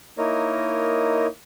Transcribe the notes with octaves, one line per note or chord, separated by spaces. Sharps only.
A#3 D#4 E4 A#4 C#5 D#5